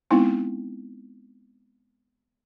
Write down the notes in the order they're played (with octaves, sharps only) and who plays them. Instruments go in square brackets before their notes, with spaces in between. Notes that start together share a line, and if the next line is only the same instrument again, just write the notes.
[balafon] G#3 B3 C4 D#4 E4